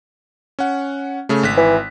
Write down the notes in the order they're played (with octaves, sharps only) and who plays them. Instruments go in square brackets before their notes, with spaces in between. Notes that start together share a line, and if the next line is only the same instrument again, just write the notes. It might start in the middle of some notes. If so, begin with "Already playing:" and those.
[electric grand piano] C#4 F#5
C#3 A3
G#1 F#6 B6
[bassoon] E3